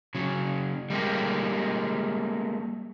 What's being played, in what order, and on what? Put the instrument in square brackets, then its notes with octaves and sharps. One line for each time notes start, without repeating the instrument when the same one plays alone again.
[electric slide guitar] C#3 F#3
G3 G#3 A#3 G4